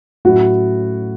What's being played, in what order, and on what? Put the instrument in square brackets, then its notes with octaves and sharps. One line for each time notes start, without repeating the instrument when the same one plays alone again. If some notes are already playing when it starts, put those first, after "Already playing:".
[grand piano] A2 F#3 C#4 E4 [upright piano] F#4